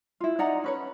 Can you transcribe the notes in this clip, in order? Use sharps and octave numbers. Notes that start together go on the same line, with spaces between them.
E4 F4
D#4 D5 F#5 A#5
C#4 B4 C#5